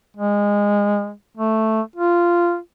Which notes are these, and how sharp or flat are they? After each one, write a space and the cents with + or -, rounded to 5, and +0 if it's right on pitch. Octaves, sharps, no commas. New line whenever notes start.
G#3 -20
A3 +0
F4 -10